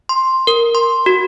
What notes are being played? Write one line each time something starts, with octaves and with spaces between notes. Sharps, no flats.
C6
A#4
C6
F#4